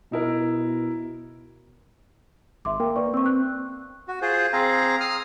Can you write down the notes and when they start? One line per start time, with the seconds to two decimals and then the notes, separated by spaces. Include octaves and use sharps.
0.12 B2 D#4 E4 A#4
2.65 G#1 E5 C6 D6
2.80 A#3 A#4 G5
2.96 B4 D5 C#6
3.14 C4 C#6 E6
3.26 F#6
4.07 F#4
4.22 F4 G#4 C5
4.53 C4 G#4 F5 A#5
5.00 D#6 F6